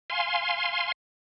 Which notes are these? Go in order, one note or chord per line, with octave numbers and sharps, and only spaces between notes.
F5 G#5 C6